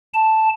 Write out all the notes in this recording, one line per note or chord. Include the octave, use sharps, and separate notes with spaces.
A5